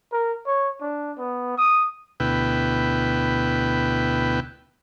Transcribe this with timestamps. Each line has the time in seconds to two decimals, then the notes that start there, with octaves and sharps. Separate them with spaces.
0.12 A#4
0.47 C#5
0.81 D4
1.18 B3
1.58 D#6
2.20 D2 B2 E4 B4 G5